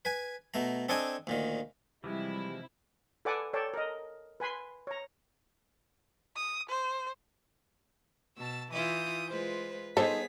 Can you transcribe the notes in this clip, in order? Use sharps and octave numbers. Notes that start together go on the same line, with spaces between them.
B4 G#5
B2 A3 A#5
C4 D4 A4 D#5 G5 G#5
D2 A#2 D#3
C3 E3 F3 G3 G#3 E4 G4
A4 B4 D5 F#5 G#5 D6
A4 C#5 D5 G5 A5
A#4 D#5
B4 G#5 B5 C6
C#5 A#5
D#6
C5
B2 A5 E6
E3 E4 F4 D#6 G6
G#3 F4 B4 C5
B3 D#4 G#4 A4 C5 C#5 B6